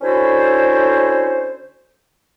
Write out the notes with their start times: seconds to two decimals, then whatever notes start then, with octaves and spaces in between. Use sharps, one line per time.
0.01 D3 C#4 E4 F#4 A4 C5